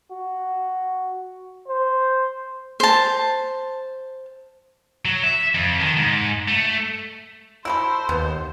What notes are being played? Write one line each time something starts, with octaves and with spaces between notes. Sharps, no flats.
F#4
C5
C5 A5
F#3
E5
F2
D#3
G#2
A3
E4 F#4 A4 C5 B5 E6
D#2 B3